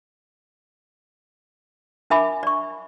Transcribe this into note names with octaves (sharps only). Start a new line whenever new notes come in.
D4 A#4 E5 G#5 B5 D6
D5 C#6